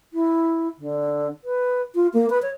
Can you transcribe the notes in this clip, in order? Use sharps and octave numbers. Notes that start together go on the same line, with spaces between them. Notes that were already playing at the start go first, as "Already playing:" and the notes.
E4
D3
B4
F4
A#3
B4
C#5